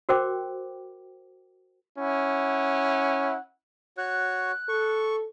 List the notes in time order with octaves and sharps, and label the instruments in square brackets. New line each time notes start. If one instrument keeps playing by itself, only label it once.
[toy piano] F#4 A#4 C5 G5 D6
[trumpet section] C#4 E4 F#5
[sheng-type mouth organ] F#4 C#5 [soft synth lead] F#6
[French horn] A4 [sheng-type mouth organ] C#6